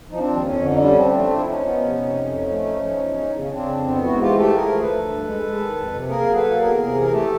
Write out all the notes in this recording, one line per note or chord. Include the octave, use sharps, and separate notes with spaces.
F3 D#4
C4 D4
D#2
F2 C#4
D3
D#4
G3 D4
C#4
F3 C4 D4
A3
F3
E4
F3 C#4 D#4
B3
C3
C3
F2
F3
A3
F3
F3
E2
E2
C#3
C#3 C4 D4
F2
B3
G#2 E4 F#4
E3 F4 G4
A3 G4 A4
F3 G#4 A#4
D2
A4 B4
D2
G2
G#3
G#3
D#3
F2
C3
A#3 G#4 A#4
F#3
A4 B4
A#3
E2 G#4 A#4
C3
E3
A#4
A3 G4 A4